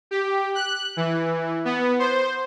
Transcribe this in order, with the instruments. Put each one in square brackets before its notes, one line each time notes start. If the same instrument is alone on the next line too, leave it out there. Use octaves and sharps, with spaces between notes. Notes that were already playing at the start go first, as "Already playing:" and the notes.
[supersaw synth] G4
F#6
E3
B3
C5